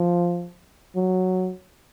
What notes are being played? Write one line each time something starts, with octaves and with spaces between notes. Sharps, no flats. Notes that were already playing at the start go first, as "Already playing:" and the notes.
Already playing: F3
F#3